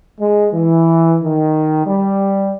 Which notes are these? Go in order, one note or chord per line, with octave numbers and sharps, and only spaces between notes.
G#3
E3
D#3
G3